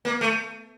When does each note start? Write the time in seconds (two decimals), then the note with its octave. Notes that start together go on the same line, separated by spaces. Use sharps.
0.05 A#3
0.21 A3